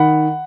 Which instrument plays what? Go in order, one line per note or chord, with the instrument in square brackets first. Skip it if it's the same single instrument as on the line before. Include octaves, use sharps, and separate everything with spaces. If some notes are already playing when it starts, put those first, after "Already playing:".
Already playing: [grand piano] D#3 F#5 B5